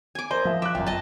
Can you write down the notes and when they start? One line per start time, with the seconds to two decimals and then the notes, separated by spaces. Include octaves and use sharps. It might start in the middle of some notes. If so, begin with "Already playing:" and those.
0.15 G#5 D6
0.31 A#4 C5 D#5
0.45 F3 E5
0.62 E5 D6 F#6
0.75 G1 F#2 F4 G5
0.86 D#5 A5